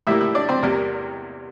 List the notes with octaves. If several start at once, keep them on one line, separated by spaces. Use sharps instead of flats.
A2 G3 A#3 E4 E5
E4 E5
D4 D5
C4 C5
E2 C3 G3 A#3 A#4